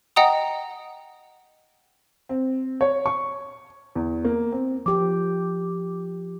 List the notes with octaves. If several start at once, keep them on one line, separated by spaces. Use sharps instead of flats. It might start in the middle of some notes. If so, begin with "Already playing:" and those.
D#5 F#5 G5 A#5 D#6
C4
C#5
C#6
E2
A#3
C4
F3 G4 D6